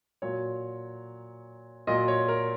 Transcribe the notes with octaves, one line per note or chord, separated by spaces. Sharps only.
A#2 F#3 C#5
A#2 F#3 D#5
C#5
A#4